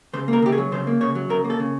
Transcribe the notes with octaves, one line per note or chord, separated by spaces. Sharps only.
C#3 C5
A#3
A#4
C#3 G4
G#4
F#3
C#3 C5
A#3
C#3 C#5
F#3
C#3 A#4
A#3
A4
C#3